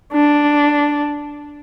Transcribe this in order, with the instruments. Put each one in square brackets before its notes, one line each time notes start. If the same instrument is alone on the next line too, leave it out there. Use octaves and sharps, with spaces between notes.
[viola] D4